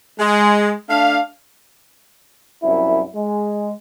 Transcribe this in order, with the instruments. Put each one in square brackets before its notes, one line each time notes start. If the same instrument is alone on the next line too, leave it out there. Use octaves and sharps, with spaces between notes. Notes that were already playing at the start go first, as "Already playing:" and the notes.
[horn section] G#3
A3 D4 F5
[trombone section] C2 F#2 E4
G#3